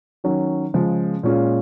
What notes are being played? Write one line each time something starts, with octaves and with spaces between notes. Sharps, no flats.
D#3 F#3 C#4
C#3 F3 G#3
A#2 G#3 C#4 F4